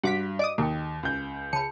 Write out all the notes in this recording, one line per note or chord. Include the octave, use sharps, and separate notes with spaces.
G2 F#4 F#5 D6 B6
D5 D#5 D6 D#6
D#2 A#3 A4 G5
C#2 G6
C#3 A5 B5 C#7